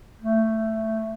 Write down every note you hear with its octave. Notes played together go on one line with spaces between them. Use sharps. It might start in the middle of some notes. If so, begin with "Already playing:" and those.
A3